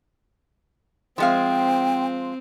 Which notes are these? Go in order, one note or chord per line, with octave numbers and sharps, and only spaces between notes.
F3 G#3 C4 F5 G5